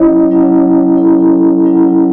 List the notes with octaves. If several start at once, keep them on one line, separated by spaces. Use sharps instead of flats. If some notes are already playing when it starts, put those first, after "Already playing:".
Already playing: F#3 C#4 E4 C#5 D#5
F#3 C#4 E4
F#3 C#4 E4 A4
F#3 C#4 E4